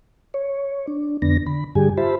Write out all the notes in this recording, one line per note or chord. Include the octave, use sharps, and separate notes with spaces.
C#5
D4
F2 D3 B3 D4 A#6
D3 B5
G2 D3 G3 G4 G#4 G#5
F4 G4 C5 E5 A5 B5